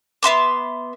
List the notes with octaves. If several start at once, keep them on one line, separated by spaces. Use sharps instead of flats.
B3 E5 C6 D6